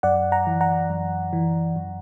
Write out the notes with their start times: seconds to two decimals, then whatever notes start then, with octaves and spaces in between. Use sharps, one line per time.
0.03 F#2 D5 F#5
0.32 F#5 A#5
0.47 E3
0.61 F#5 A#5
0.90 F#2
1.33 E3
1.76 F#2